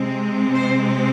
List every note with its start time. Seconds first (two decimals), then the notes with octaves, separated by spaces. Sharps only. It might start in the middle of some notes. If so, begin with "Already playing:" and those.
Already playing: C3 G#3 C4
0.55 C5